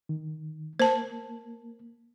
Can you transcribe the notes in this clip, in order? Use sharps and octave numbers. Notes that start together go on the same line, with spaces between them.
D#3
A#3 C5 A5